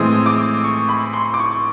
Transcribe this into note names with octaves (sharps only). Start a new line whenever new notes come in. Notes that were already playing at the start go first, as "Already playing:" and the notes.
Already playing: A2 E3 G#3 C4 D#6
D6
C#6
B5
C6
D6
C#6